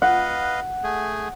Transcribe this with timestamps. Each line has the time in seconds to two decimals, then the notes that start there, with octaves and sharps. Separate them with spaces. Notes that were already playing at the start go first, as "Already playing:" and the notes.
0.02 B4 D#5 F5 F#5
0.84 A3 G#4